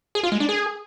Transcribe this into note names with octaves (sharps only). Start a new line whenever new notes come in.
G#4
F4
G#3
D4
G#4